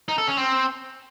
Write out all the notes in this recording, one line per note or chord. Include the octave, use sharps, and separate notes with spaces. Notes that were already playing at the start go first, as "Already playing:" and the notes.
D#4
A4
C#4
C4